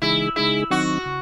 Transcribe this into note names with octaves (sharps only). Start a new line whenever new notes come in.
C#3 E3 G#3 D#4 E4 G#4
C#3 G#3 D#4 E4 G#4
D#3 F#3 C4 D#4 F#4
C#3